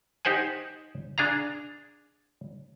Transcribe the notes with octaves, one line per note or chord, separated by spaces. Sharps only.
D#4 G4 C5 F#5 G#5
D4 G#4 F5 A#5